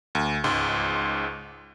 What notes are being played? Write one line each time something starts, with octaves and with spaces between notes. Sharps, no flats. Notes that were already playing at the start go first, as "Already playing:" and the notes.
D2
C#2 G#2 C6